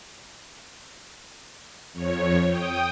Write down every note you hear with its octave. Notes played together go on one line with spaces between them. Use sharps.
F2 C#5
G5 D#6